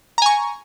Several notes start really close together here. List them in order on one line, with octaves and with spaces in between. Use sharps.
A#5 G#5 C#6